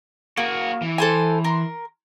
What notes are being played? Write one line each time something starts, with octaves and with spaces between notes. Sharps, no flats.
A#3 F#4 G#4
E3
A4 C5 G#5
A#4 C6